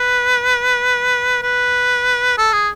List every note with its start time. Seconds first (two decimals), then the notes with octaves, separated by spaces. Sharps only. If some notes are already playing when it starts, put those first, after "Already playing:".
Already playing: B4
1.42 B4
2.38 A4
2.53 G#4